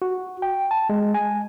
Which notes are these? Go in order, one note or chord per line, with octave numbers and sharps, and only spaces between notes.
F#4
G5
A5
G#3
G#5